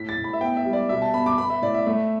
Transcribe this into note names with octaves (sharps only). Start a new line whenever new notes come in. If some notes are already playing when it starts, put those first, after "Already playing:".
Already playing: A2 B6
A6
A2
B5
E5
B3 G5
E5
G3
D5
B2 E5
A5
B3 B5
D6
B3 B5
E5
A2 D5
E5
A3 E5